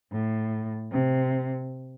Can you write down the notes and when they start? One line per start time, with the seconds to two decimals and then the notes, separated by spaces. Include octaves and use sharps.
0.11 A2
0.91 C3